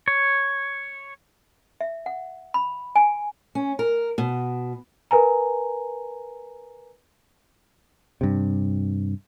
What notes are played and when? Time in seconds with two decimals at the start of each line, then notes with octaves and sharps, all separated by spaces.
0.08 C#5
1.81 E5
2.06 F#5
2.54 B5
2.96 G#5
3.55 C#4
3.79 A#4
4.18 B2
5.11 A#4 B4 G#5 A#5
8.21 G2 C3